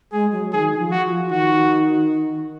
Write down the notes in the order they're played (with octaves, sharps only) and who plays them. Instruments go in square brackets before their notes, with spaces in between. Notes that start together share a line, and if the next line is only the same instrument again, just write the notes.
[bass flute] G#3 [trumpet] G#4
[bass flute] F#3
[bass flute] D#3 [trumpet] G#4
[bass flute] D#3
F3
[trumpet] F#4
[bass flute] F3
F3
[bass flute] D#3 [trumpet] F#4